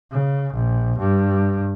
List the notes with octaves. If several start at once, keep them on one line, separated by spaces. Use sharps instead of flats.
C#3
A#1
G2